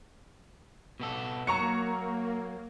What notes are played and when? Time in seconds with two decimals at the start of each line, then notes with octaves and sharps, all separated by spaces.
1.00 B2 B3 A4
1.47 F#3 A#3 A#5 C#6 C#7